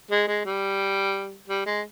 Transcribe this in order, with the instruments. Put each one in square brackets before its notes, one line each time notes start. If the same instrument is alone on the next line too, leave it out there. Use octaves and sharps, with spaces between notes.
[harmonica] G#3
G#3
G3
G3
G#3